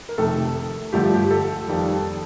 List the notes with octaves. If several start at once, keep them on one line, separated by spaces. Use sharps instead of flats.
A#4
F2 C3 D#3 A3 A4
G2 D3 F3 A3 G4
G4
A4
F2 D#3 G3 A#3